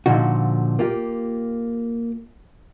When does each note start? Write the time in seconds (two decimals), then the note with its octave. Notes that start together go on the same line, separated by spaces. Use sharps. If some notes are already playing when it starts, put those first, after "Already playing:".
0.06 A#2 D3 F3 D#4 F#4
0.79 A#3 F4 G4